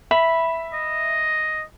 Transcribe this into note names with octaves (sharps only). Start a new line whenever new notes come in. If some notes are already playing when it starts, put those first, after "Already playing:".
E5 B5
D#5